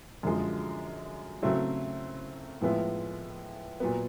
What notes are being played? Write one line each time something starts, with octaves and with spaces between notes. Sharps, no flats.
F#2 D3 F3 G#3
C#3 F#3 A3 C4 E4
A2 F3 G#3 B3 E4
A#2 F#3 B3